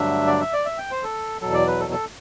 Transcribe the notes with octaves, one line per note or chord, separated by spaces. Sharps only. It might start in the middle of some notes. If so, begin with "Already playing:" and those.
Already playing: G2 D3 F#3 A3 D4 E5
D5
E5
D5
E5
G5
C5
A4
E2 B2 F#3 A4
D5
B4
A4
A4